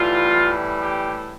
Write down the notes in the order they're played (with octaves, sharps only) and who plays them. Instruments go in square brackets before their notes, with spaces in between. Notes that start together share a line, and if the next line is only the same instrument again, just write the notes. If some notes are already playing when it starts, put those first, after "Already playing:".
Already playing: [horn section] A2 E3 G3 F4
G4